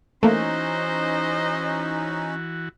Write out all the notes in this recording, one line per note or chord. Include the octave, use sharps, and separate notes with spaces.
E3 A3 A#3 C#4 D#4 F#4 C5 D#5